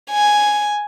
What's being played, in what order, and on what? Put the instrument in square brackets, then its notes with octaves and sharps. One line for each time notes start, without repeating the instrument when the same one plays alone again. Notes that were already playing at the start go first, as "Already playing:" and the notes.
[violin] G#5